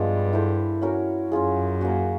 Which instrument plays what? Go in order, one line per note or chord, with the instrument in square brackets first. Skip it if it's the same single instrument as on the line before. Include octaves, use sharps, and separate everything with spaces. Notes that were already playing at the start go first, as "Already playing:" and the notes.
Already playing: [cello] G2 [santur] F3 G#3 B3 D4
[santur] E4 A4 C5
C#4 F#4 A#4 C#5
[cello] F#2 [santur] C#4 F4 G#4
[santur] A#3 C#4 F#4